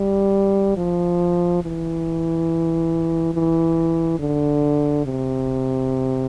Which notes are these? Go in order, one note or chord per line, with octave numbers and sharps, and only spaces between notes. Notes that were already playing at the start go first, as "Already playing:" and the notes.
Already playing: G3
F3
E3
E3
D3
C3